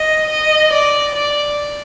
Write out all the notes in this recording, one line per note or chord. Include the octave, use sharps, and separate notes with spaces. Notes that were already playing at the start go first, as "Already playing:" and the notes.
Already playing: D#5
D#5
D5
D5